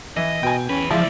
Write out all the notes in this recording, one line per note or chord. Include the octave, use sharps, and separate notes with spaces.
E3 D#5
B2 G5 G#5
E2 C#4 B4
C#2 F3 G#3 E4 D5